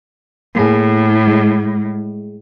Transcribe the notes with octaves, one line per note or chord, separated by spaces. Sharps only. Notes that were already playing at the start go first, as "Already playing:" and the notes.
A2 A#3 G#4
G#3